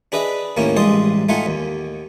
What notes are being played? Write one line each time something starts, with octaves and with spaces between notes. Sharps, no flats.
D4 G#4 B4 D#5 E5
D#2 A2 A#3 C#4
A1 G2 G#3 A5 C6 D#6
A3 D#4 F4 F5 F#5 G#5
D#2